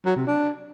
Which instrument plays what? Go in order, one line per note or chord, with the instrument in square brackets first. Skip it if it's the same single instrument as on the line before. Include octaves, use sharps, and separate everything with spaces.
[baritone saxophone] F#3
C3
D4